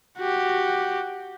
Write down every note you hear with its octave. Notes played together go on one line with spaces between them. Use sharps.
F#4 G4